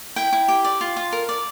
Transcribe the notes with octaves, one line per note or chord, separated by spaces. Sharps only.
E4 G5
E4
G4
D5
F4
F4
A#4
D5